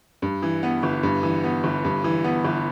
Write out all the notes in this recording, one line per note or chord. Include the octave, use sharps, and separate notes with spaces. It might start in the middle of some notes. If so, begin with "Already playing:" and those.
G2
E3
B3
G1
G2
E3
B3
G1
G2
E3
B3
G1